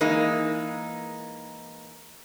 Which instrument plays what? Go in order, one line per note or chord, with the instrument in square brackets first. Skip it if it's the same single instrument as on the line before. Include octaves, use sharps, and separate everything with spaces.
[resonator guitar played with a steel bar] E3 G#3 A#3 D#4